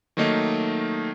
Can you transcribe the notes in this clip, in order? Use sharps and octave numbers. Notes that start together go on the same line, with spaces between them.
D#3 F#3 A3 A#3 D#4